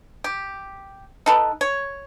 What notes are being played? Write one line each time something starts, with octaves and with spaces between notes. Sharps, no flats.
G4
D#4 A4 B4
C#5